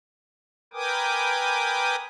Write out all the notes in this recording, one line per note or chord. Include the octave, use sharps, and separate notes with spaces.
A#4 B4 G5 G#5 D6 D#6